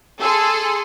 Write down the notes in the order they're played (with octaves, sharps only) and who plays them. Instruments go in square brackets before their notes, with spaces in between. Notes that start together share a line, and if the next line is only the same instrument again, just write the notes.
[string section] G#4 A4 C6 [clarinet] E6